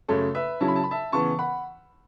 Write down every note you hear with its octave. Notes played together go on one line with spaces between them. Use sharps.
F#2 C#3 A3 A4 C#5
B4 E5
C#3 F#3 C#4 E4 A5
B5
A5
B5
E5 A5
C#3 E3 B3 A5 C#6
F#5 B5